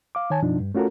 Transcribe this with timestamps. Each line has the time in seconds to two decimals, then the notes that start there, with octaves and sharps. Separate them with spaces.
0.15 F5 D6
0.30 D#3 C#5 G#5 A5
0.42 F#2 B2 F3 D4 D#4
0.60 G2
0.75 A3 C#4 F4 F#4 A4 A#4